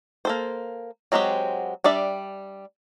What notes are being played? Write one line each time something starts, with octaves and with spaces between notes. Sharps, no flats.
A#3 A4 C5
F#3 G#3 C4 F#4 G4
G3 D4 D5 E5